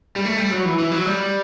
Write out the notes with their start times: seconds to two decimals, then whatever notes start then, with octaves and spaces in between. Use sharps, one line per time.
0.16 G3
0.25 A3
0.38 G3
0.51 F#3
0.65 E3
0.79 E3
0.92 F#3
1.06 G3